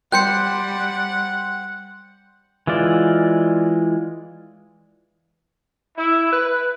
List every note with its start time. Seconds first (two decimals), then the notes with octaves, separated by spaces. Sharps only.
0.12 G3 C5 F#5 G5 F#6 G6 C#7
2.67 E3 G#3 F4 D5
5.97 E4
6.32 B4